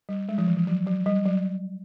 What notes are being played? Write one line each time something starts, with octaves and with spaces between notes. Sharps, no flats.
G3
G#3
F3
E3
F3
F#3
F#3
G3
F#3